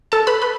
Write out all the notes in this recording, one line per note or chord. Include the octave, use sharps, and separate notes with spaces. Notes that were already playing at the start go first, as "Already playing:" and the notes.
A4 A5
B4 B5
B4 B5